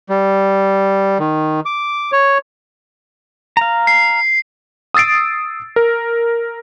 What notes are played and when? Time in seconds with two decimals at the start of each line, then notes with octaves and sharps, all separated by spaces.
0.10 G3
1.20 D#3
1.66 D6
2.12 C#5
3.57 F5 A#5
3.87 C7
4.94 D#6 E6 A6 C7 D7
5.76 A#4